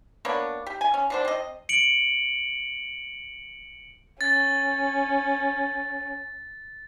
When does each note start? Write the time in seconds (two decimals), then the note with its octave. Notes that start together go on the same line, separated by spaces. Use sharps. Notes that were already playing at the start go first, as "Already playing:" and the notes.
0.25 A#3 B3 D4 C#5
0.66 G4
0.81 G#5
0.94 C#4
1.10 B2 D4 C5
1.25 C4 D#5
1.69 C#7 D7 F#7
4.21 C#4 A6